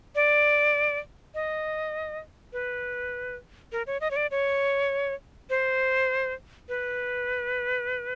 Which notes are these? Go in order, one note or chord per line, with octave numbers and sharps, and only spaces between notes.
D5
D#5
B4
A#4
C#5
D#5
C#5
D5
C#5
C5
B4